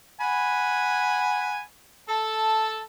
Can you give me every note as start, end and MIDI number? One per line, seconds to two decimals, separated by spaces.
0.21 1.59 78
0.21 1.59 80
0.21 1.59 83
2.09 2.80 69
2.09 2.80 81